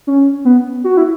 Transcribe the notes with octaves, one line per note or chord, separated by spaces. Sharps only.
C#4
B3
F#4
E4